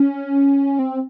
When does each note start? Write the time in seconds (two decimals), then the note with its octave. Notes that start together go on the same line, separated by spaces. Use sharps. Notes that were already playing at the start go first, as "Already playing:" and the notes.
Already playing: C#4
0.79 C4